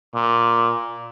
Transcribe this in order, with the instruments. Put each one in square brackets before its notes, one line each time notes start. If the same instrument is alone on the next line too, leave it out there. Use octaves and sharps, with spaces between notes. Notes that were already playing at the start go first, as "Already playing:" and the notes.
[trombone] A#2